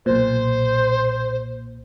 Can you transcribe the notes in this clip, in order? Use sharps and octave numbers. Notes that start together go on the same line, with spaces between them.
B1 A#2 C5